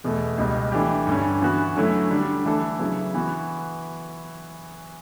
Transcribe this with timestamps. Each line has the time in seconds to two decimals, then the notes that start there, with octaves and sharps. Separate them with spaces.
0.04 E2 B2 A3
0.38 C#2 B2 G3
0.72 E3 A3 D4 G4
1.07 G2 D3 G3 C#4
1.41 E3 B3 F#4
1.76 D3 F#3 A3 C#4 E4
2.11 D3 G3 D4
2.45 E3 A3 D4 A4
2.79 C#3 F#3 B3 E4
3.14 E3 B3 F#4